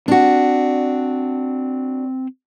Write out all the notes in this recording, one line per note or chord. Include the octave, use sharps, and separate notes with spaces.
C4 D4 F#4